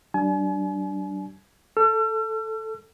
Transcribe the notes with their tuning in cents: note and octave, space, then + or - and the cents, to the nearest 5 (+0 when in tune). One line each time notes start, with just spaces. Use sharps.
G3 -45 D4 +0 G#5 +40
A4 +0 E6 +45